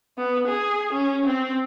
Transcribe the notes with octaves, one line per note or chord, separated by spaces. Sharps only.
B3
G#4
C#4
C4